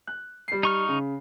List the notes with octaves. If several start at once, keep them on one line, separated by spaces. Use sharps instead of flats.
F#6
G3 C7
D#4 C#6 F6
C#3